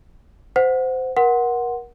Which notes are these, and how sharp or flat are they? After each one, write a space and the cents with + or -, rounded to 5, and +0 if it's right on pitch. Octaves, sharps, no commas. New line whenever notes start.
C5 -20 F#5 -10
A#4 +30 F#5 +0 C6 +0